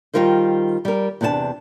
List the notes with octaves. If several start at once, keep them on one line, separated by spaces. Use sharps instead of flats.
D#3 F#3 G3 F4 A#4 C5
G3 A#4
E2 C3 D4 G#4 A5